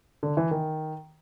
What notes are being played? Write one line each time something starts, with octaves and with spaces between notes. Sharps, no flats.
D3
E3
D#3